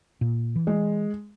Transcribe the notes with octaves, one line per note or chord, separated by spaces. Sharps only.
A#2
E3
G#3